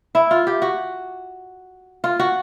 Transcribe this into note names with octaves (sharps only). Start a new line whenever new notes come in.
E4
F4
G4
F#4
F4
F#4